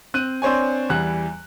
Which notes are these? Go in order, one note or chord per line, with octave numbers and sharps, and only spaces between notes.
C4 F#6 D#7
C4 D4 C5 C#5 G#5
E2 E3 G3 F#6